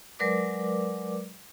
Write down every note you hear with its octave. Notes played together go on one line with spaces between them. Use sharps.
F#3 G#3 A#4 B4 D5 D6